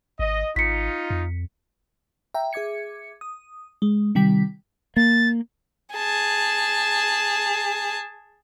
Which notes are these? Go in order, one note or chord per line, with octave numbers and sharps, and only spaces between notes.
G#1 D#5
G#1 D#4 F4 B6 C#7
F2
E5 G5 A#5
G#4 E5 D6 G#6 C#7
D#6
G#3
C3 D#3 G3 G5 B6
A#3 A6
G#4 A5